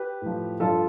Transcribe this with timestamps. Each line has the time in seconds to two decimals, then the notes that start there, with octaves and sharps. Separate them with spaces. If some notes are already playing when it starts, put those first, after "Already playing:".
Already playing: G4 B4
0.21 A2 F3
0.60 G2 D3 F3 F4 A4